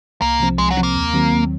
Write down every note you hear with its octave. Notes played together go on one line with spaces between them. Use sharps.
C2 A#3
C3 F3 C4
C2 G#3
F#3
C3 F3 C4
A#3
D#2
D#3 F#3 C4
D#2